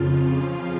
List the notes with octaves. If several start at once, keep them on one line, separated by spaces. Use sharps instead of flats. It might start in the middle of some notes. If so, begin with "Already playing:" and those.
Already playing: F2 C#3 F3 F4
F4